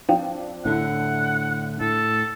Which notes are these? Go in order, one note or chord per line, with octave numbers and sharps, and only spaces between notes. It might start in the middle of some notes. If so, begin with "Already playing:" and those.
F3 C4 D4 F5 G5
A2 D3 D4 E4 F#5
A2 A4